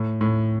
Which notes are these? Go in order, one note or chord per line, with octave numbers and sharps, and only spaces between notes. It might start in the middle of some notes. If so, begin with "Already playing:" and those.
Already playing: A2
A2